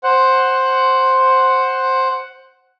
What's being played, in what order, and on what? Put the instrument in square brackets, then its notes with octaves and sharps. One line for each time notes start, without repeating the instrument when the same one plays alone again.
[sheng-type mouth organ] C5 F#5